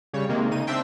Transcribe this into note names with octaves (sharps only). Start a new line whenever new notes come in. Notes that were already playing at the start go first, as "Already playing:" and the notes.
C#3 G3 C#5
C3 D#3 G#3 A#3
C#3 D#4 D#7
C4 D4 E5 G5 C6